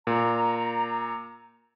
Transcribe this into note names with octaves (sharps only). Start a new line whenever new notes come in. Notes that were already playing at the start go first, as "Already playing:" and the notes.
A#2 A#5